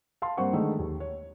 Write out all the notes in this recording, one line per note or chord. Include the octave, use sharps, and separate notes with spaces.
F5 A5 C6
G2 A#3 C4 C5 F#5 C#6
D3 D#3 G#3 A3
D#2
C#5